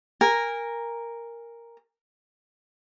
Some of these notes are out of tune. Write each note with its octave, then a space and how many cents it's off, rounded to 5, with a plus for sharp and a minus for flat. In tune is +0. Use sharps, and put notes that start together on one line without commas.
A#4 +0 G#5 -25